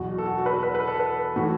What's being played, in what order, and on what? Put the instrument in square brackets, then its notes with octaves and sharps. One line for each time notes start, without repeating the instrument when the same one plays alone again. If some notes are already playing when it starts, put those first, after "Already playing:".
Already playing: [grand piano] E2 B2 F#3 F#4
A4
F#4
F#4
B4
A4
B4
B4
A4
B4
A2 E3 A3 F#4